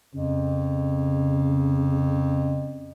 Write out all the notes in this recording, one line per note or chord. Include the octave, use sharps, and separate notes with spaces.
F2 C#3